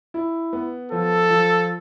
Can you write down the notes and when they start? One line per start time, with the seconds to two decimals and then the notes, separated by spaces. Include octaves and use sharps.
0.14 E4
0.53 B3
0.92 F3 A4
1.30 F3